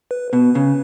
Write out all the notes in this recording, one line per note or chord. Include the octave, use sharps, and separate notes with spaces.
B4
B2 B4
C#3